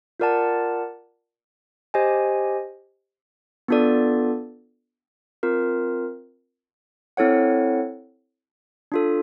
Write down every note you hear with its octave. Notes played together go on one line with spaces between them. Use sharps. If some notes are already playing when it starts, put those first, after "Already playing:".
F4 A#4 D5 F#5 A5
G4 C5 D#5 G#5
B3 D4 F4 A4 D5
C4 F4 A#4
C4 E4 A4 C#5 F#5
D4 F4 A4